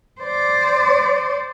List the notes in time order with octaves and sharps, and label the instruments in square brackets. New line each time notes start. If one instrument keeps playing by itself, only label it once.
[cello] C5 D5